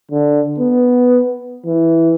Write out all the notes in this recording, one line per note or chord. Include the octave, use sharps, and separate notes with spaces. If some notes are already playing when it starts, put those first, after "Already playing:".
D3
B3
E3